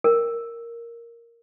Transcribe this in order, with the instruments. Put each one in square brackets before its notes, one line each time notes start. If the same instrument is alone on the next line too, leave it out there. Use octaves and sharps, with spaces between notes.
[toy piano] A#4